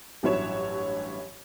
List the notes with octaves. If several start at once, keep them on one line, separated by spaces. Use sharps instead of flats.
A1 G2 F#3 E4 C#5 E7